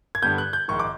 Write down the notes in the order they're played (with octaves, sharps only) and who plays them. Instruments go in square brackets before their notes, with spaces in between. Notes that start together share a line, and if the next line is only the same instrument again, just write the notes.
[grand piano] G#6
G2 D3 G3 B3 G6
F#6
G6
A#1 G#2 D#3 C#6
D6